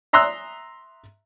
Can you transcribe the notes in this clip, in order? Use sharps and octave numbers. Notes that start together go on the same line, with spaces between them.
E5 A#5 C6 D#6 E6 F#6